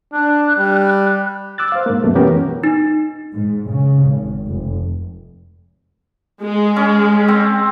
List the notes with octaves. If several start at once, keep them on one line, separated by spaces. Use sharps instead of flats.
D4 F#6
G3
D6 E6 F#6 A6
C5 F5
G#2 A#3
C2 F#2 B2 A3
E3 B3 C#4 G4 A#4
D#4
G#2
C#3
G#1
F1
G#3
C#4
C4